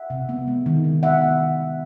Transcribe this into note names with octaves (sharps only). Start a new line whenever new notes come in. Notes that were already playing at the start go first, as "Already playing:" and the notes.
Already playing: E5 F#5
C3
B3
G#3
D#3
D#3
B3 E5 F#5
G#3
D#3
D#3